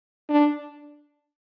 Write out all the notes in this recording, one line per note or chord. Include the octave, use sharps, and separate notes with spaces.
D4